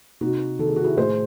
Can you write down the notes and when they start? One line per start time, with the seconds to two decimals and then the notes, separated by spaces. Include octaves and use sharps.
0.21 C3 D#4 F#4
0.59 D#3 A4
0.68 G#4
0.76 F#4
0.84 E4 G#4
0.97 A2 G#4 C5